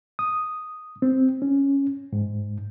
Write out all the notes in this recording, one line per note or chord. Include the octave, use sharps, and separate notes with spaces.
D#6
C4
C#4
G#2